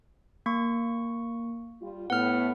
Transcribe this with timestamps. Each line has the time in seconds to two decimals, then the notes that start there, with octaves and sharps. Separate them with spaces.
0.46 A#3 C#6
1.81 G3 F4
2.10 A2 B3 F#5 F6